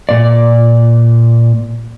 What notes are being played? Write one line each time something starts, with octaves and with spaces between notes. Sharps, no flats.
A#2 D5